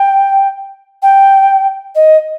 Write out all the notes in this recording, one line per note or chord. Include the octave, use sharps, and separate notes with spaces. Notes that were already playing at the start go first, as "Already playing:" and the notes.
Already playing: G5
G5
D#5